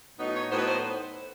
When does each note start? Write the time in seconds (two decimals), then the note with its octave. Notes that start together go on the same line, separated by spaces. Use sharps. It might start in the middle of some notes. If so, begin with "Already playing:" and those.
0.18 A2 F#3 B3 D#4
0.34 C#5
0.51 A2 F#3 B3 D#4 C5
0.59 B4
0.67 C5